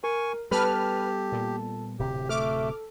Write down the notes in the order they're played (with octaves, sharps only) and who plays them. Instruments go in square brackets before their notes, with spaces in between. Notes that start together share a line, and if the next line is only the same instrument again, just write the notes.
[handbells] A#4 [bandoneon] G#5 C#6
[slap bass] G3 B3 [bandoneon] G4 [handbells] A4 A5 [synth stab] B4 F6
[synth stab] A#2
[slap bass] D1 C3 [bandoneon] G4
[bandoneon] A3 [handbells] A4 [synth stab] D6 F6